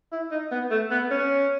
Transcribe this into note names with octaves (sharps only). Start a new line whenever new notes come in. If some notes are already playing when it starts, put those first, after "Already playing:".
E4
D#4
B3
A3
B3
C#4